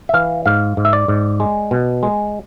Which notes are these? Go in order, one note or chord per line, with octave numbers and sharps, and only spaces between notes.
E5
E3 F5
G#2 F5
G#2
E5
D5
G#2
G#3
B2
G#3